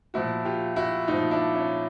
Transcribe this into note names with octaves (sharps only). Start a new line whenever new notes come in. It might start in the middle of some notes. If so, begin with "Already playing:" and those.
A#2 F3 E4 F#4
F4 G4
E4 F#4
A#2 F3 D#4 F4
D4 E4
C#4